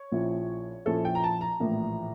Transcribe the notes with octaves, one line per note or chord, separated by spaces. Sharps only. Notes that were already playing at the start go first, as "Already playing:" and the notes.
Already playing: C#5
A#1 A#2 F3 C#4 E4
A#1 A#2 F3 C#4 E4 A4
G5
A#5
A5
A#5
A#1 A2 E3 A#3